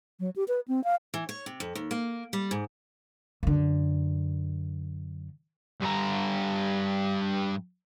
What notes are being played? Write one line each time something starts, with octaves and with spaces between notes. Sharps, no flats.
F#3
G4
B4
C4
F5
E3
C#5
C3
F2
D#2
A#3
G3
G#2
F#2 D3
G2 A#5